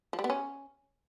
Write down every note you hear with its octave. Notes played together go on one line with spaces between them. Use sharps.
F3
G3
B3
C#4